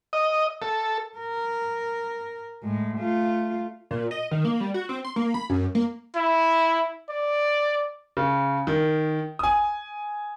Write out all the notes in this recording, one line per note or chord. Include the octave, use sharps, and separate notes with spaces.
D#5
A4
A#4
A2 G#3
A3 F4
A#2
D#5
D#3
A#3
G3
F#4
C4
C6
A#3
B5
F#2
A#3
E4
D5
C#3
D#3
G#5 D#6